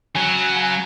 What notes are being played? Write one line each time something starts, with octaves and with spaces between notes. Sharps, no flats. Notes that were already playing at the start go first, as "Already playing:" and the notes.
C#3 F#3